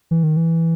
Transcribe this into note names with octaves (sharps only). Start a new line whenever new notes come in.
E3
D#3
E3